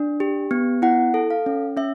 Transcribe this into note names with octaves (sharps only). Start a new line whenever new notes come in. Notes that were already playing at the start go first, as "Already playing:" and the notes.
Already playing: D4
G4
B3
E4 F#5
A4
F5
C#4
C#4 E5